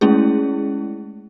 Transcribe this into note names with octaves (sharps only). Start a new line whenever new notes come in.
G#3 A3 C#4 E4 G#4